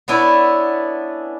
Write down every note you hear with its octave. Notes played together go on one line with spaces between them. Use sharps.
B3 C#4 D4 E4